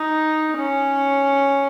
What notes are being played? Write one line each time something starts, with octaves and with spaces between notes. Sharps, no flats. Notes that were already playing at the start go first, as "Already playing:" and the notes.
Already playing: D#4
C#4